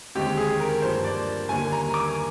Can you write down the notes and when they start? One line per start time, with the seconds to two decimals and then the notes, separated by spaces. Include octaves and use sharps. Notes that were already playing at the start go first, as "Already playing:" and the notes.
0.15 D#2 D3 G#3 C4 G4
0.37 G#4
0.60 A#4
0.82 G2 F3 A#3 C5
1.05 D5
1.49 D#2 D3 G3 A#3 G#5
1.72 A#5
1.94 D6